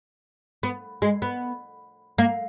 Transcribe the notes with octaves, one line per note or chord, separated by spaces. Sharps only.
B3
G#3
B3
A#3